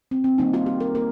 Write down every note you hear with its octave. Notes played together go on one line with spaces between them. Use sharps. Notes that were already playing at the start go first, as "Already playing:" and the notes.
C4
C4
D#3 G3 A#3 D#4
F4
G4
A#4
A#3 A#4